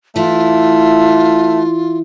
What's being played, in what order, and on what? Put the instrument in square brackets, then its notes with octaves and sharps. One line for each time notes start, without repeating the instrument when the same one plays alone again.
[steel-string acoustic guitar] E3 E4 [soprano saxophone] A3 [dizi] F4